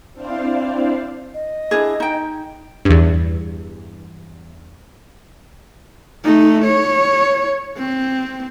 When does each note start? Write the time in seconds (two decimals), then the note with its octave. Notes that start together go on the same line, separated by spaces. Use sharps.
0.13 C4 D4 E4 C5 D5 F5
1.34 D#5
1.71 D4 E4 G#4
2.00 D#4 G5
2.85 E2 G2
6.24 A3 D#4
6.65 C#5
7.78 C4